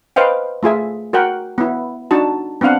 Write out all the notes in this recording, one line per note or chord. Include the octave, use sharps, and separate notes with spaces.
B4 C5 D#5 F5 G5
A3 F4 G#4 E5
F#4 A#4 F#5 G5
B3 E4
D4 D#4 F#4 A5
B3 C4 D4 F5 F#5